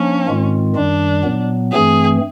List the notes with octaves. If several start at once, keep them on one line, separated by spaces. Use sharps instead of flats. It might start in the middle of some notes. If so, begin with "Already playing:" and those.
Already playing: F3 A#3 C#4 D4
G#2 D#3 G#3 C4 F4
F#2 D#3 G3 D4
A#2 F#3 B3
G2 E3 A3 C4 G#4